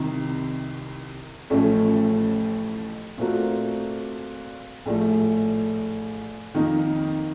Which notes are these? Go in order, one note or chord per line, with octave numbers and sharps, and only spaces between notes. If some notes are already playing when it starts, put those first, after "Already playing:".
Already playing: C2 C3 D#3
A1 A2 F3 A3 C#4
A#2 A3 C4 F#4 A#4
A#1 A2 F3 A3
F2 D#3 A#3 D#4